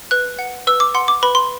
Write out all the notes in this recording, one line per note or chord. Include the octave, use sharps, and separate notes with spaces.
B4 F#6
F#5
B4 E6
D6
F#5 C6
D6
B4 B5
C6